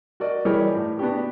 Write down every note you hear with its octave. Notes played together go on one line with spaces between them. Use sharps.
F#4 A#4 D5 D#5
E3 G3 G4 G#4 A#4 C#5
A2
B3 D4 F#4 G4